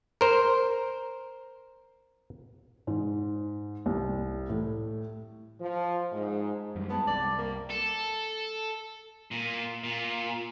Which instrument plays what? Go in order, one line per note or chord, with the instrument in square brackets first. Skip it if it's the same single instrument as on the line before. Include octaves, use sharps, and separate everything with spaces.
[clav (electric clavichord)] A#4 C5
[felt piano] G#2
C2
A2
[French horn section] F3
G#2
[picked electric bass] F#2 G3 G#3
[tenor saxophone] B3 [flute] A5
[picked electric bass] C2 [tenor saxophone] D5
[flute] G5
[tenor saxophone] A#3
[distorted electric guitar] A4
A#2
A#2